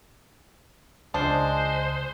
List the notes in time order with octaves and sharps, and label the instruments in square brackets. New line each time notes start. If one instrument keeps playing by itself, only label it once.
[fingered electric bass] C#2 [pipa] F3 D4 [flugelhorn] G#3 [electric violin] C5